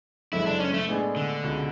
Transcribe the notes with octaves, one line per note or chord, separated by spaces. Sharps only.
F#1 F#2 D3 G#3 E4
D4
C#4
A3
A2 G#3 B3 D4 G#4
D3
C#2 B2 G#3